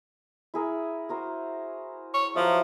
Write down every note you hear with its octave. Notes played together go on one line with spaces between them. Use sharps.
E4 G#4 A#4
F#4 A#4 C5
C#5
F3 F#3 B4 E5